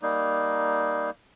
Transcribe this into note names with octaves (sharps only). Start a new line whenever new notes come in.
G3 A#3 D#4